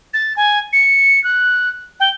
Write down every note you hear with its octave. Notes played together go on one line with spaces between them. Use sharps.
A6
G#5
C#7
F#6
G5